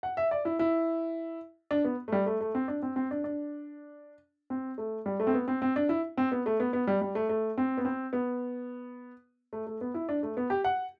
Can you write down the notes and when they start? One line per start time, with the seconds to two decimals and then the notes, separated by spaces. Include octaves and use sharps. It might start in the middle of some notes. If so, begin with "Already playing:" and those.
0.03 F#5
0.17 E5
0.31 D5
0.45 E4
0.59 E4
1.71 D4
1.85 B3
2.08 A3
2.12 G3
2.26 A3
2.41 A3
2.55 C4
2.68 D4
2.82 C4
2.96 C4
3.11 D4
3.24 D4
4.50 C4
4.78 A3
5.06 G3
5.20 A3
5.27 C4
5.34 B3
5.48 C4
5.62 C4
5.76 D4
5.89 E4
6.17 C4
6.32 B3
6.46 A3
6.60 B3
6.73 B3
6.87 G3
7.01 G3
7.15 A3
7.29 A3
7.58 C4
7.78 B3
7.85 C4
8.13 B3
9.53 A3
9.67 A3
9.81 B3
9.94 E4
10.09 D4
10.23 A3
10.37 B3
10.50 G4
10.64 F#5